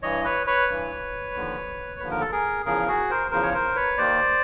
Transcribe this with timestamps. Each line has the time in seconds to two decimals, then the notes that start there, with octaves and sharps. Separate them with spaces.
0.02 G2 E3 C#5 D#5
0.25 B4 C#5
0.47 B4 C#5
0.69 G2 E3
1.35 D#2 D3 F3
2.00 D#2 D3 F3 B4
2.11 A#4
2.21 A4
2.32 G#4 A#4
2.65 E2 C#3 F3 G#4 A#4
2.88 F#4 G#4
3.10 A#4 C5
3.31 E2 C#3 F3 A#4 C5
3.43 C#5
3.54 A#4 C5
3.76 B4 C#5
3.97 D#2 D#3 C5 D5